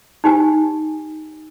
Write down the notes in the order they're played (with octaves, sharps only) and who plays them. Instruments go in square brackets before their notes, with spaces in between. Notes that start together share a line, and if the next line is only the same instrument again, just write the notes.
[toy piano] D#4 G4 G#5